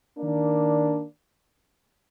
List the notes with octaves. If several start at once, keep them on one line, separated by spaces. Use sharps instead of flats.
D#3 A#3 D4